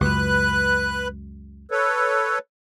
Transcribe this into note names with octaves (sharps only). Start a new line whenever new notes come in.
C#2 F#2 B4 F#6
A4 B4 C#5